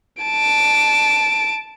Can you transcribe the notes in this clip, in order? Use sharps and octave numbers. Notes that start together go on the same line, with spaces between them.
A5 D7